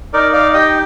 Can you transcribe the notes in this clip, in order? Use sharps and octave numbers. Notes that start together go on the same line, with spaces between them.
D#4 A#4 D5
D5 F5
G4 D#5 G5